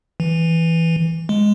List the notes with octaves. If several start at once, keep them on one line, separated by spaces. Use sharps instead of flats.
E3
G#3